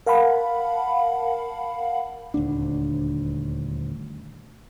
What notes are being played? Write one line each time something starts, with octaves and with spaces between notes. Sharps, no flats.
A#4 F5 F#5 A5 B5
D#1 D2 D4